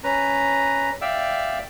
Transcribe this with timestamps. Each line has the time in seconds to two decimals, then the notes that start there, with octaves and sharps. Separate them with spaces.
0.04 C#4 B4 A#5
1.01 D5 E5 F5 G5 E6